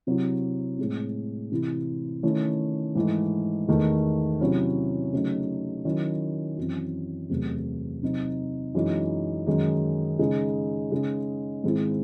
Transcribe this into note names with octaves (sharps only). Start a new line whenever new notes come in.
C3 F#3 C4 E4
A2 G#3 C4
C3 E3 C4 E4
D#3 A3 C#4 E4
G#2 E3 A3 D#4
E2 D#3 A3
C3 F#3 C#4 E4
C#3 F#3 A3 D#4
D#3 F#3 C#4 E4
F#2 E3 C4
E2 C3 F#3 A3
C3 F#3 C4 D#4
F#2 E3 G#3 D#4
F#2 D#3 G#3 D#4
C#3 G#3 D#4
C#3 G#3 D#4
G#2 D#3 G#3 C4 E4